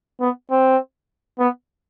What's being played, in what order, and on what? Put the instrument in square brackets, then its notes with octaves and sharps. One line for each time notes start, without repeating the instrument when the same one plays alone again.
[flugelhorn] B3
C4
B3